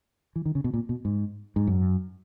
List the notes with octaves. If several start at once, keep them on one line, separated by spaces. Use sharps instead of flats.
E3
D#3
C#3
B2
A#2
B2
G#2
G#2
F#2